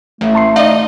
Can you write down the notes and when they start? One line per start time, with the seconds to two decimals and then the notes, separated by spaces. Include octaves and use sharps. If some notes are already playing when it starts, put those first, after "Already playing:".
0.21 A1 A3
0.35 A5 C6 C7
0.56 D#4 D5 D#5 F5